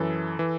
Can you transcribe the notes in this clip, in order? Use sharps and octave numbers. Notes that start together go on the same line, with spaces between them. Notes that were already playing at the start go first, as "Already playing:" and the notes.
Already playing: F#2 E3 A4
E3